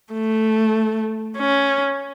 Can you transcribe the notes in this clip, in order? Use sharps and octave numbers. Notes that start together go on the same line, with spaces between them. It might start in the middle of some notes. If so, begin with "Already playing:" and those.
A3
C#4